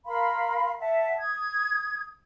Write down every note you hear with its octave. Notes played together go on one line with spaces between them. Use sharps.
A#4 F5 B5 C6
E5 F#5 A5
D#6 G#6